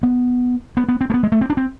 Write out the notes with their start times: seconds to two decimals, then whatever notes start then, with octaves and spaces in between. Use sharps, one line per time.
0.03 B3
0.77 B3
0.89 B3
1.01 C4
1.10 A3
1.14 B3
1.23 G#3
1.32 A3
1.41 C4
1.50 D4
1.57 C4